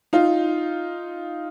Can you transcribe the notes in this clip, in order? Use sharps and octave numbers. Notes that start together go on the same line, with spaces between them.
D#4 F4